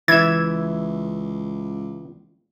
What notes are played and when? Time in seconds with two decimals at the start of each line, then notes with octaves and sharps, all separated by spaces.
0.08 C#2 E3 E5 G#6